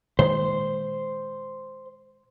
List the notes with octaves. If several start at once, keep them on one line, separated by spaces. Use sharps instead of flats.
A#2 D#3 G#3 C5